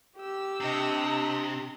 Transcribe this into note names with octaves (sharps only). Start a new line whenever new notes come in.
G4 E6
C3 D4 D#5